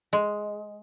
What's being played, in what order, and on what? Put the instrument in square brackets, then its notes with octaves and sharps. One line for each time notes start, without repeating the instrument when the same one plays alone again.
[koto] G#3